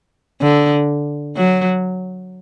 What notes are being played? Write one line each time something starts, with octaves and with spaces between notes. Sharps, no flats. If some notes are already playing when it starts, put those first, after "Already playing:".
D3
F#3